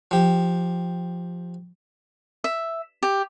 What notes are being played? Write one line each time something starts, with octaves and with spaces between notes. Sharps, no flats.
F3 G4
E5
G4